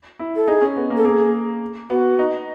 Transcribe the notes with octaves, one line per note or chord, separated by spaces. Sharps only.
E4
A4
D#4 G#4
C#4
B3
A#3
A4
A#3 G#4
B3 F#4
D#4